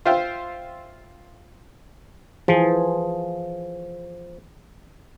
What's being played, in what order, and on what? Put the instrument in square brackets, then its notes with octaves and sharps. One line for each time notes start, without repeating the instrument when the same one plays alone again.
[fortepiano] F4 C5 E5 F5 G5
[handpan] E3 G#4 [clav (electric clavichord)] F3